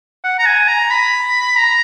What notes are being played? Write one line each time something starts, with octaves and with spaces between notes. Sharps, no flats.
F#5
A#5
G#5
A#5
B5
A#5